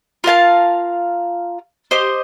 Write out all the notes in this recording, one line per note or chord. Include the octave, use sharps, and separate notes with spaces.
F4 A#4 F5 A5
G4 C5 D#5